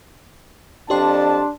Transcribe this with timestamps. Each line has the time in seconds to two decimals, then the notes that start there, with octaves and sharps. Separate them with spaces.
0.90 F2 D4 G4 D5 A5 C6